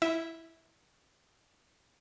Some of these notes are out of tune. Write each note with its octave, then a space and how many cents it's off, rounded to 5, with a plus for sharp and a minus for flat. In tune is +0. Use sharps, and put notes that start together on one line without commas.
E4 +0 E5 -20